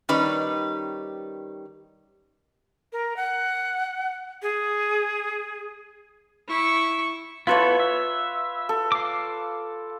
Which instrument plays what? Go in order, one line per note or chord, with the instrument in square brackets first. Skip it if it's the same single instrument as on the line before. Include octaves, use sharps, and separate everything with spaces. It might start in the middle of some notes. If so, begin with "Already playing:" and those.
[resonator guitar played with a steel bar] D#3 G3 C#4 D#4 B4 D5
[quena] A#4
F#5
G#4
[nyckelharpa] E4 C#6
[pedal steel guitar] B3 E4 A4 [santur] F4 B4 C#5
[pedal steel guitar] E5
[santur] A4
[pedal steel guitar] F5 D6